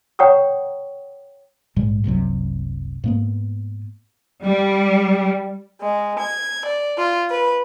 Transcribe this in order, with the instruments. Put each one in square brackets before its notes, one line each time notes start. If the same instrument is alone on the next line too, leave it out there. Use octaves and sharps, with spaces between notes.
[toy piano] C#5 F#5 G5 A#5 C#6 D#6
[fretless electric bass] A#1 G#2 G3 G#3
F#1 C2 C3 F#3
G#2 A#3 B3
[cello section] G3
[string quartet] G#3
G#6
D5
F4
B4